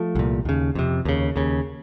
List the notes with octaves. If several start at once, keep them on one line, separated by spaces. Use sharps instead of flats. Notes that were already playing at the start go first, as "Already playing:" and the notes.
Already playing: F3 A3
C2 A#2
D#2 C#3
F2 C3
D#2 C#3
D#2 C#3